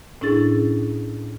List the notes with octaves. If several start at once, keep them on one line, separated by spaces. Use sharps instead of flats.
A2 C#4 D4 E4 G#4 A6